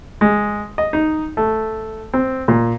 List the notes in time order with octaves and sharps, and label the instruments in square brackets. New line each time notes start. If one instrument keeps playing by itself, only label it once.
[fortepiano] G#3
D#5
D#4
A3
C4
A#2